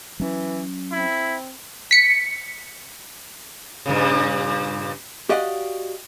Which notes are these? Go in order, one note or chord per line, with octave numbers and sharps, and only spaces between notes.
E3 F#3 C#4
C4 E4
B6 C#7
G2 A#2 C#3
F#4 G4 D5 D#5 F5 F#5